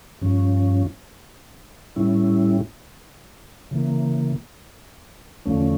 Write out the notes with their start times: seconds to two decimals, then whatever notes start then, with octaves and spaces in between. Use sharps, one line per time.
0.21 G2 F3 C#4
1.96 A2 G3 C#4 E4
3.71 C#3 E3 A#3
5.45 E2 D3 F3 A3 C#4